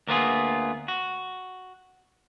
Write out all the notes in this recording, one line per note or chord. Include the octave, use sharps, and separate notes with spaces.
D2 A#3 B3 F4 G#4
F#4